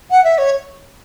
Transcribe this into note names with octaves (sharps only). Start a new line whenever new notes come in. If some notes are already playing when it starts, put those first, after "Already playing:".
F#5
E5
C#5